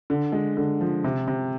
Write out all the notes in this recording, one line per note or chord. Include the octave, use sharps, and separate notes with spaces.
D3
G#3
D3
F3
C3
C3